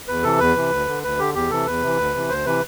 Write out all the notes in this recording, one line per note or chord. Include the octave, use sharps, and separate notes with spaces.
E2 B4
C3 E3 A4
E2 B4
C3 E3
D2
D3
D2 B4
D3 G4
E2 G4
C3 E3 A4
E2 B4
C3 E3
D2
C3 E3
D2 C5
C3 E3 B4